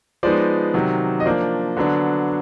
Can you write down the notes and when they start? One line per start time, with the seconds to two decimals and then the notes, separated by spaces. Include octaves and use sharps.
0.23 F3 G#3 B3 D#4 C5 D5
0.74 C3 D#3 F#3
1.20 D#5
1.25 F3 A#3 D4 C5 D5
1.77 D3 F#3 B3 D4